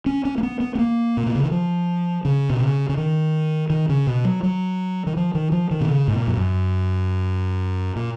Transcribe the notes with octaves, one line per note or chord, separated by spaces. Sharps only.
C#4
C#4
A#3
B3
B3
B3
A#3
A#2
B2
C#3
D#3
F3
C#3
B2
C#3
C#3
D#3
D#3
C#3
B2
F#3
F#3
D#3
F3
D#3
F3
D#3
B2
C#3
G#2
A#2
F2
F#2
A#2